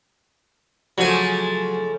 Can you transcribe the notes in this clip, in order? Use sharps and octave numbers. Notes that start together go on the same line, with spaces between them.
C#3 F3 F#3 A3 G#5